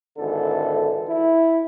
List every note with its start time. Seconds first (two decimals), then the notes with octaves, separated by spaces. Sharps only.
0.18 G#1 D3 E3 A4
1.09 E4